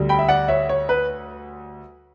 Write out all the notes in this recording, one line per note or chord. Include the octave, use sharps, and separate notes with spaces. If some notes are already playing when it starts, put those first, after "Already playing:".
Already playing: D2 D3 G3
G5 B5
E5
D5 F#5
C#5 E5
C#5
B4